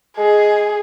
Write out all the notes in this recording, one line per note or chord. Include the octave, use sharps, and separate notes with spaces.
G#3 G#4